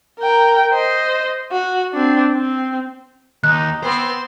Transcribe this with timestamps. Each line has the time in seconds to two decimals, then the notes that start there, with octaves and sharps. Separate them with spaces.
0.19 A#4 G5
0.73 C5 D#5
1.52 F#4
1.93 C4 D4
2.34 C4
3.44 D#2 D#4 F#6
3.83 B3 C4 C5 C6